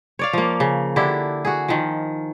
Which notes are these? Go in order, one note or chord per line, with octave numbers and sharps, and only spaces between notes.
C#5 D5 F5
F3 A#3
C#3
D3 D4 E4 G4
F#4 G#4
D#3 F3